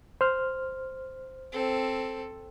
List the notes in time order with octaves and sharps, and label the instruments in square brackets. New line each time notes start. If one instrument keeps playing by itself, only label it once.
[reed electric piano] C5 F6
[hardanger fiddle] C4 A4